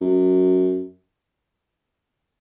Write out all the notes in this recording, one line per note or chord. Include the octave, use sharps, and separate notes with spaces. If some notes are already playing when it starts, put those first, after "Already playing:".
F#2